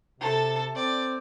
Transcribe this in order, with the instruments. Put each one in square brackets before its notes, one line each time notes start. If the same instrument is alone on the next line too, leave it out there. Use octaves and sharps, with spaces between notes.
[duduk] C3 [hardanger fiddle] A4 A5
[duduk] C4 [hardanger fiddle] D5